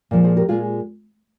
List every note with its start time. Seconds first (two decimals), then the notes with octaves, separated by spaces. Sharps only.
0.11 A#2 F3 G#3
0.24 G#4 C5
0.36 G4 A#4
0.49 A#2 G#3 F4 G#4